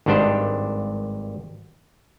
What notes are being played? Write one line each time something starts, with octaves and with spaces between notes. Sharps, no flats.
G#1 G2 D#3 D4 G4 C5